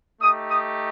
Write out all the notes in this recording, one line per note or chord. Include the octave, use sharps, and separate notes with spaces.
A3 D#4 G4 D#6
D#6